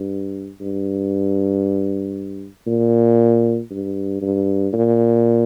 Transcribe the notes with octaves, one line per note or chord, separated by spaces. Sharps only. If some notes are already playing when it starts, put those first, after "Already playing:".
Already playing: G2
G2
A#2
G2
G2
A#2